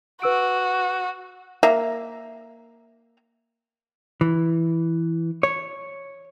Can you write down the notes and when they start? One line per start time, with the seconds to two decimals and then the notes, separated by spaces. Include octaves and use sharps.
0.22 F#4 B4 E6 D7
1.63 A#3 E5 A#5
4.21 E3
5.43 C#5